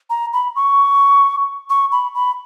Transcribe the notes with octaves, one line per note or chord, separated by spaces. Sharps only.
A#5
B5
C#6
C#6
B5
B5